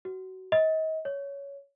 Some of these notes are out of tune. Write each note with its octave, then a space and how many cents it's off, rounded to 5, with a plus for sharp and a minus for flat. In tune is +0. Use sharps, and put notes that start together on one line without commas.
F#4 +25
D#5 +35
C#5 +15